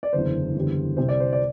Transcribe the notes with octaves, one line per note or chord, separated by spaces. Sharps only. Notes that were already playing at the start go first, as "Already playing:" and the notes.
D5
F#1 E2 D3 C5
F#1 E2 D3 G3
C2 C3 G3 C5
D5
C5
D5